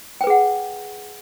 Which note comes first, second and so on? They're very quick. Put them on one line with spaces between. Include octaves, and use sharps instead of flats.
G5 B4 G#4 F#5